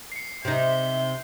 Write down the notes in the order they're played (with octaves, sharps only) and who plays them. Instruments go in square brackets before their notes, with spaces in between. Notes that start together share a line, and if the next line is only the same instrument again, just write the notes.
[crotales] C7 C#7
[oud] C3 D#4 [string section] E5 [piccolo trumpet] G6